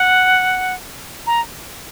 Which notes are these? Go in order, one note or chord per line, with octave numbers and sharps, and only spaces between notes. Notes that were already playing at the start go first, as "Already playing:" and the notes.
Already playing: F#5
A#5